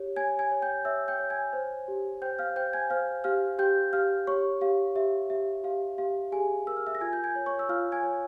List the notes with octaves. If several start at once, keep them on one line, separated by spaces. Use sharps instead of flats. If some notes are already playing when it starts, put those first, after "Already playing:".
Already playing: G4 C#5
C#5 G#5 G#6
G#5 G#6
C#5
G5 G6
C#5 E5 E6
G5 G6
C#5
G#5 G#6
C5
G4
C5 G5 G6
F5 F6
C5 G5 G6
G#5 G#6
C5 F5 F6
G4 F5 F6
G4 G5 G6
G4 F5 F6
G4 C#5 C#6
G4 F5
G4 E5
G4 E5
G4 F5
G4 F5
G4 G#4 G#5
A#4 E6
F6
E5 E6
A#6
F4 G#5 G#6
G6
G#5 G#6
C#5
C#5 C#6
E6
F4 F5 F6
G#5 G#6
C#5